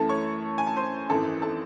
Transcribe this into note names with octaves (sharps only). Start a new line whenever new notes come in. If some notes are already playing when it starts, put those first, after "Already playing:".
Already playing: F#2 E3 A3 A4 A5
C#5 C#6
G#5
A5
C5 C6
G#1 F#2 E3 A4 A5
A4 A5